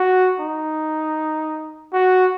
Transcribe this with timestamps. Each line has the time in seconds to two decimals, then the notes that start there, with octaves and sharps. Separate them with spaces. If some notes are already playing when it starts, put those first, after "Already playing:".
Already playing: F#4
0.40 D#4
1.93 F#4